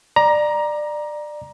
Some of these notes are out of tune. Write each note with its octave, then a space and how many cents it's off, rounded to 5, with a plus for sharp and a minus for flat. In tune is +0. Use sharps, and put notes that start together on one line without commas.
D5 +25 A#5 +15